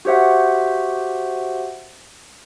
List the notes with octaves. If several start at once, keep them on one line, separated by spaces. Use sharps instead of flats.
F#4 G4 C5 E5 F#5